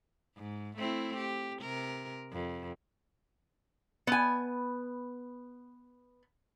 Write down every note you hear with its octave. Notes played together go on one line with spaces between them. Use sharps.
G#2
A3 C4 E4
G4
C3 A#4
F2
B3 G#5